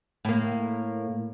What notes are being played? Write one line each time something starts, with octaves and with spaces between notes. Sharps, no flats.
A2 A#3